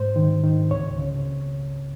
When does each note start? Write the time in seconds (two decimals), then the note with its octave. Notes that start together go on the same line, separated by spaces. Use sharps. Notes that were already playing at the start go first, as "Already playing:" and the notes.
Already playing: G#2 C5
0.16 D#3
0.44 D#3
0.71 C#2 C#5
0.98 C#3